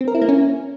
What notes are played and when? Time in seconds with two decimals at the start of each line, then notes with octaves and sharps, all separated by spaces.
0.01 C4
0.08 A#4
0.15 E4
0.22 A#3
0.28 C#4